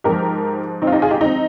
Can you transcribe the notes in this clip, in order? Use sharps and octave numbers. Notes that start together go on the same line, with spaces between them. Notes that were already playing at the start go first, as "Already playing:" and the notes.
G#2 F3 G4 A#4
C4 D#4
F4
D#4 G4
F4 G#4
D#4 G4
C4 D#4